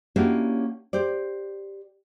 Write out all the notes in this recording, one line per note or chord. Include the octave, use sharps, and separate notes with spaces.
A#3 C#4 D4 E4 F#4 G4
G4 C5 D5